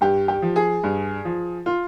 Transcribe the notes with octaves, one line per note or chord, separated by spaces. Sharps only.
G2 G4
G4
F3
G#4
G2
F3
F4